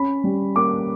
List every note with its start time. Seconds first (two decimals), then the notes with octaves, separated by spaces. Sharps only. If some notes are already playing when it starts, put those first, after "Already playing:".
Already playing: C#4 B5
0.24 G3
0.56 A#3 D6